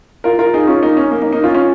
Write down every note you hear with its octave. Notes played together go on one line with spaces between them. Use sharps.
F4 A#4
F4 A#4
D#4 G#4
C#4 F4
A#3 D#4
C#4
A#3
A#3 D#4
A#3 D#4
C#4 F4
C#4 F4